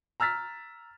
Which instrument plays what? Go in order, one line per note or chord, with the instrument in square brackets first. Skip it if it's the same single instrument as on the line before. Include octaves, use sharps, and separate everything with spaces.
[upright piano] A#5 E6 F6 A6 B6